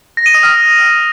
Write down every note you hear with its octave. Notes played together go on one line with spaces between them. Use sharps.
A#6
D#7
D#6
F6